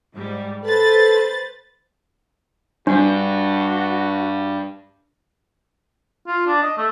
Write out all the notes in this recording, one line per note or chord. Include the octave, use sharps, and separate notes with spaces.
G#2 G3
A4 B4 C5 A6
G2 D4 F#4
F4
D4
D#5
A3